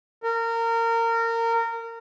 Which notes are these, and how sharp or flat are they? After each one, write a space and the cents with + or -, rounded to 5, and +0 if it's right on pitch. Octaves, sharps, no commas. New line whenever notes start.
A#4 -25